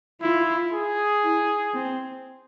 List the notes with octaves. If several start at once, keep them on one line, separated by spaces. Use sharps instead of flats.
E4 F4
G#4
E4
C4